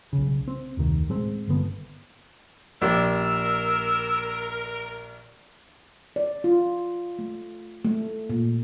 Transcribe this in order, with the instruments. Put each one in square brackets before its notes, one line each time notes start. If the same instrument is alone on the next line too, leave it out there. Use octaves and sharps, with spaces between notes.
[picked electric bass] B1 C#3
C4
F1 D2 C3 D#3
A2 G#3 C4
G1 D3 B3
[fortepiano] A#1 G4 D5 [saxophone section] A#4 [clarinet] E6
[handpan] D5
F4
A3
A3
A#2